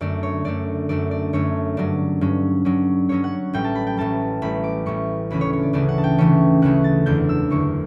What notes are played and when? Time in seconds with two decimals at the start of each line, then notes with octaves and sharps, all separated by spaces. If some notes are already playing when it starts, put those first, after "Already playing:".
0.01 F#2 D3 A3 D5
0.23 C#5
0.44 F#2 D3 A3 D5
0.89 F#2 D3 A3 D5
1.11 D5
1.33 F#2 D3 A3 C#5
1.77 G2 F#3 C#4 D5
2.21 G2 F#3 C#4
2.65 G2 F#3 C#4 D5
3.09 G2 F#3 C#4 C#5
3.24 F#5
3.53 A1 A2 G3 G5
3.64 A5
3.75 B5
3.87 G5
3.97 A1 A2 G3 A5
4.42 A1 A2 G3 B5
4.64 D6
4.86 A1 A2 G3 C#6
5.30 D2 C#3 E3 A3 C#4 B5
5.41 C#5
5.53 C#5
5.63 D5
5.73 D2 C#3 E3 A3 C#4 D5
5.89 F#5
5.98 A5
6.04 G5
6.18 D2 C#3 E3 A3 C#4 C#6
6.62 D2 C#3 E3 A3 C#4 F#6
6.84 A6
7.06 F#1 E2 D3 G6
7.29 E6
7.50 F#1 E2 D3 C#6